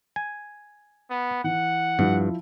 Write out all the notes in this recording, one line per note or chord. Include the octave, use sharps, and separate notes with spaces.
G#5
B3
E3 F#5
G2 F3 E4